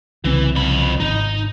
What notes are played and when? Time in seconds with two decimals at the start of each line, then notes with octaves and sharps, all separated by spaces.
0.24 C2 C#3 E3 C4
0.55 F2 B5
1.00 G#1 D#4